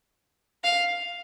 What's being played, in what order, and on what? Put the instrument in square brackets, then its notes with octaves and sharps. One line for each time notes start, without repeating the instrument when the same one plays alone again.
[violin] F5